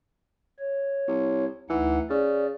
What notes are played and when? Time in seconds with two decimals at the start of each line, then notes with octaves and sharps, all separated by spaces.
0.59 C#5
1.07 C2
1.70 D2 E3 D#4 F#5
2.10 C#3 D5